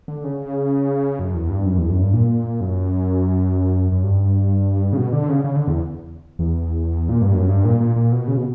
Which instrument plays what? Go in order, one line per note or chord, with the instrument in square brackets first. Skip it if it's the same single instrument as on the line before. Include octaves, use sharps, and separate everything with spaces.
[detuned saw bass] D3
C#3
F#2
E2
G2
F#2
E2
F#2
G2
A#2
F#2
F#2
G2
C#3
B2
D3
C#3
C#3
D3
E2
E2
A#2
G2
F#2
G2
A#2
A#2
A#2
B2
C#3
B2